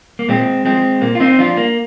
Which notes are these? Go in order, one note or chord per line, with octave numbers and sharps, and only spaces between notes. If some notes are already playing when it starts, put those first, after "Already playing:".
A#3
A#2 G#3 C4
F3 G#3 C4
A#2 A#3
F4
C4 D#4
F3 D4 F4
A#3